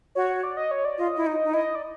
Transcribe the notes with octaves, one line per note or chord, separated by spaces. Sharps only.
F#4 C#5
D5
D#5
C#5
D5
F4 D#5
E4
D#4
D#4
E4 D#5
D5